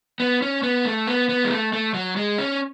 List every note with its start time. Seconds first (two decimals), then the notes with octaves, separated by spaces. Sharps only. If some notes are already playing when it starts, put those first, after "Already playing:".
0.20 B3
0.42 C#4
0.63 B3
0.85 A3
1.07 B3
1.29 B3
1.45 G#3
1.51 A3
1.73 A3
1.94 F#3
2.16 G#3
2.38 C#4